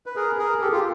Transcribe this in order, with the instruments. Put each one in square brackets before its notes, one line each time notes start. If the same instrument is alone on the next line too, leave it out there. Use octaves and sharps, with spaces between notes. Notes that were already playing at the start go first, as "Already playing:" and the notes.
[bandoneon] B4
G#4 A#4
G#4 A#4
G4 A4
F4 G4